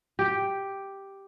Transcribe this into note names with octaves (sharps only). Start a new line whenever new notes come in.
G4